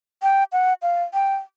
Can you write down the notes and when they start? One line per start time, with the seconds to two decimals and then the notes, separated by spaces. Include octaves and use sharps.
0.23 G5
0.52 F#5
0.82 F5
1.14 G5